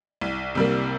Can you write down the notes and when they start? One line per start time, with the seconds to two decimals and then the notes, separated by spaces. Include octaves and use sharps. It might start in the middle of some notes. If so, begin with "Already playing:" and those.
0.21 C2
0.55 C3 G3 A#3